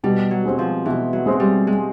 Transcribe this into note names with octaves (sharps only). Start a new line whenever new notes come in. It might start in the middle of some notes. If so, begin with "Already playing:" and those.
B2 G3
F#3
G#3 C4
F3
B2 E3
F#3
G#3 C4
G3
G#3